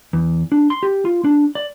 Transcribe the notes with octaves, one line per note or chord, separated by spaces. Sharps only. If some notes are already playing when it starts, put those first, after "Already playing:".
E2
D4
C6
G4
F4
D4
D5